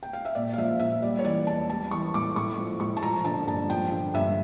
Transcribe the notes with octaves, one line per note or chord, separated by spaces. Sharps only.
G5
F5
E5
A#2 D5
F5
F3 E5
A#2 E5
G3 D5
C#5
E3 D5
E2 A5
G3 A5
E3 C#6
A2 D6
A2 C#6
F3
A2 C#6
A5
F3 A#5
D3 A5
G2 A5
F3 G5
D3
G2 E5